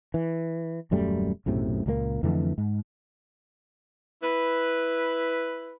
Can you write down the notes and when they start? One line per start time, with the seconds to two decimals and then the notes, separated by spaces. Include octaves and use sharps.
0.14 E3
0.91 D#1 F#2 G3 A3
1.46 B1 F#2 A2 C3
1.86 C#2 A#2 G3 A#3
2.23 F2 D3 E3 A3
2.58 G#2
4.23 E4 B4